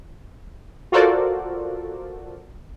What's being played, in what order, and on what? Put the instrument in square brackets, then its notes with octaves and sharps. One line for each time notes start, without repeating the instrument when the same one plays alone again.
[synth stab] F4 F#4 A4 A#4 C5 D5